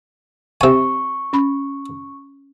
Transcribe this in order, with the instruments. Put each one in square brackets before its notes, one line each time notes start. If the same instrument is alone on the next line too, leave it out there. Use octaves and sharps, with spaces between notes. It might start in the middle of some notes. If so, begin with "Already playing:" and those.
[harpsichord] C3 G#5 [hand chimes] C#6
[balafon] C#4 B5